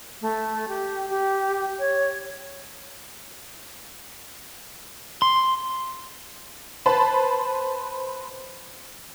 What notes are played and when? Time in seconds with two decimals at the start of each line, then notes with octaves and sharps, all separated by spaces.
0.21 A3
0.67 G4
1.10 G4
1.79 C#5
5.22 C6
6.86 B4 C5 A5 B5